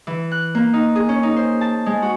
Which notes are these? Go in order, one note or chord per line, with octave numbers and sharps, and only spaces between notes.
E3
F#6
A#3
D#4
G#4
C#4
D#4
C5
A5
G#3
F#4